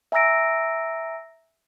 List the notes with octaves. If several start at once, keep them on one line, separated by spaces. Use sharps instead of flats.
E5 G#5 A#5 E6 A#6 D7